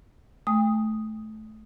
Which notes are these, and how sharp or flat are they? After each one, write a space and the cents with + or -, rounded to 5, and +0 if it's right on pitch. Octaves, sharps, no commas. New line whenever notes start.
A3 -20 G5 +40 D#6 +0